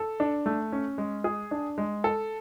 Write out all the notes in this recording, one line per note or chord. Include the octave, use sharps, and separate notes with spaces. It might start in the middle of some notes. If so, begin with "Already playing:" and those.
Already playing: A4
D4
A3
C#4
G#3
G#4
D4
G#3
A4